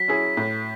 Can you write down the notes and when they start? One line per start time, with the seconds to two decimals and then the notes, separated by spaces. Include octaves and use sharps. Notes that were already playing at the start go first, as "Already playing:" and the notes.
Already playing: F#3 B6
0.08 C#4 E4 G#4
0.37 A2